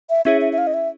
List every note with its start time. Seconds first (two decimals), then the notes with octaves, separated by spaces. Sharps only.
0.10 E5
0.25 C#4 E4 G#4 C#5 E5
0.41 E5
0.53 E5
0.58 F5
0.67 D#5
0.74 E5